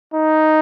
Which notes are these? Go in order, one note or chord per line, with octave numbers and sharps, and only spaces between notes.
D#4